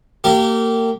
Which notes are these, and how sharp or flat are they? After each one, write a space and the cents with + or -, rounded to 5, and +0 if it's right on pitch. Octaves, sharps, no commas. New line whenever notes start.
A#3 -35 G4 -25